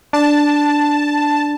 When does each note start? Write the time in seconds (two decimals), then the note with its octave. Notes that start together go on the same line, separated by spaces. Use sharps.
0.13 D4 A5